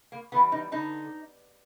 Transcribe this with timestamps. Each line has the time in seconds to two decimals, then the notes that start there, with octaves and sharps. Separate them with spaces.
0.12 A#3
0.32 E3 G3 B3
0.52 D#4
0.72 D3 D#4